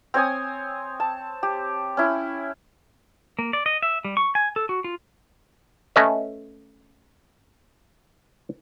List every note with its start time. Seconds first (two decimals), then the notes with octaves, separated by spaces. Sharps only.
0.14 C4 C#5 G#5 D#6
1.00 A5
1.43 G4
1.97 C#4 E4
3.39 A#3
3.53 D5
3.66 D#5
3.83 E5
4.05 G3
4.17 C#6
4.35 G#5
4.56 A4
4.69 F#4
4.84 F4
5.96 A3 C#4 B4 D#5 E5